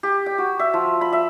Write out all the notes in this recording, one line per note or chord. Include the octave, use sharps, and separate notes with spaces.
G4
G5
F#4
E5
F3
B5
E5